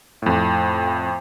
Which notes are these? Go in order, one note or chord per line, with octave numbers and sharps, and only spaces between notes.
F2 A2